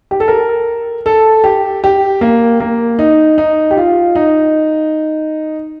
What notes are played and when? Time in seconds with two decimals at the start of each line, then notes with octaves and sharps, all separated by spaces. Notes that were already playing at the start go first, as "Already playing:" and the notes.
0.11 G4
0.20 A4
0.28 A#4
1.06 A4
1.44 G4
1.84 G4
2.21 A#3
2.60 A#3
2.99 D#4
3.38 D#4
3.71 G4
3.77 F4
4.15 D#4